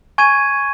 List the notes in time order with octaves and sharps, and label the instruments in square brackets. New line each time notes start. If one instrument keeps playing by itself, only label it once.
[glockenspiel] G#5 C#6 G#6 D#7